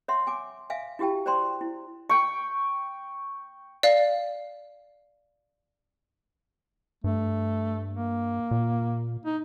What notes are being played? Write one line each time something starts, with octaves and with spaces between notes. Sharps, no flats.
C#5 E5 F#5 C6
G#5 D6
E5 F5 G#5
E4 F#4 G4 G5 A5
C5 D5 G5 A#5 C6
E4
G5 C#6
D5 F5
G2 A3
A#3
A#2
D#4